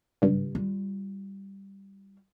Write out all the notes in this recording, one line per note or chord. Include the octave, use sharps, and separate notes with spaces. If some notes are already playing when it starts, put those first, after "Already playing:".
G#1 C#2 G2
G3 F4